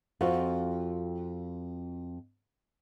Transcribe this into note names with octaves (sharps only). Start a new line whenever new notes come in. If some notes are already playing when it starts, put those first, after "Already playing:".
F2 C4 F4 F#4